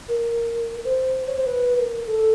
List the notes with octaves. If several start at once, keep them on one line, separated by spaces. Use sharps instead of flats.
A#4
C5
C#5
C5
B4
B4
A#4
A4